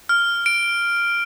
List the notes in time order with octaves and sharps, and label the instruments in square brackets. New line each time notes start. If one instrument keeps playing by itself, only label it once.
[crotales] F6
D7